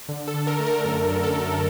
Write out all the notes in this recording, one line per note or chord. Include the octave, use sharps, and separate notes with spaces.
D3
A4
D3
A#4
A3
A#4
F#2 A#4
F#2
A4
F#2